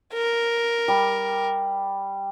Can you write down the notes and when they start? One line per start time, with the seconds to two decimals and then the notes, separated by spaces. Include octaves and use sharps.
0.13 A#4
0.88 G3